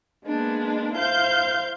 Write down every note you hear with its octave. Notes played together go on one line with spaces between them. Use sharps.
G#3 A#3 B3 D4
E4 C5 F5 G6